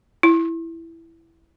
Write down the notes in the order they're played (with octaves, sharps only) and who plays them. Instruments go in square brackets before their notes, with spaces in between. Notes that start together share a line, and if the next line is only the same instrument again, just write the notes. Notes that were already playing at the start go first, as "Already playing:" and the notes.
[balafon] E4